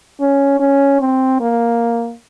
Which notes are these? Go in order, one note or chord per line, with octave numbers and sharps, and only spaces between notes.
C#4
C#4
C4
A#3